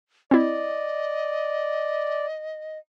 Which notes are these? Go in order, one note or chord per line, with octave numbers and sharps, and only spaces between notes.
C4 E4 D5 D#5